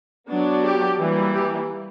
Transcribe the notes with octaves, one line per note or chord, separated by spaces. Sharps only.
F#3 B3 D4
G4
E3 G3 A#3
G4